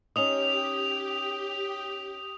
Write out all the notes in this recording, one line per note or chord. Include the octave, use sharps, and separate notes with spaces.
C#4 D#4 G4 D#5 D#6 F7